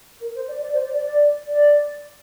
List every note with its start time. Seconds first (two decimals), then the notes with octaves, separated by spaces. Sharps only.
0.21 A#4
0.35 C5
0.49 D5
0.62 D5
0.74 C5
0.84 D5
0.94 D5
1.05 D5
1.47 D5